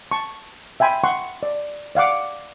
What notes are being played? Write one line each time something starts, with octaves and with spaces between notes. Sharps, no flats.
A5 C#6
E5 G5 G#5 B5 C6
F#5 C6 C#6
D5
D5 F5 F#5 D6